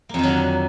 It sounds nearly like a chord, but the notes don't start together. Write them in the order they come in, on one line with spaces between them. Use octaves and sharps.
A#3 F2 D#3 F#3 D3